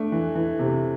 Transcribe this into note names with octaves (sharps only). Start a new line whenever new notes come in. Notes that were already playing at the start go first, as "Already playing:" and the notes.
Already playing: A3 D4
E3
E3
C3